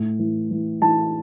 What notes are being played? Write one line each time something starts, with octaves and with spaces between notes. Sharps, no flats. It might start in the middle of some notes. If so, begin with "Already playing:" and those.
Already playing: A2
E3
E3
E3 A5